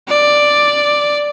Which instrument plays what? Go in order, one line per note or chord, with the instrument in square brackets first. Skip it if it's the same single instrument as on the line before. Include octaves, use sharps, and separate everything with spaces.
[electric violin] D5